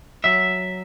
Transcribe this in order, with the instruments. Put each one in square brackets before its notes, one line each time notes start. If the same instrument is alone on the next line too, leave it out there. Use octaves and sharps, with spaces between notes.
[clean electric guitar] F#3 E5